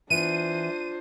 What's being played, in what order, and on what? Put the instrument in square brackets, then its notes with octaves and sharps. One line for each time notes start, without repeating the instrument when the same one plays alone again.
[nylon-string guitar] E3 B3 [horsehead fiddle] D4 C5 [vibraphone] F4 [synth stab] D#7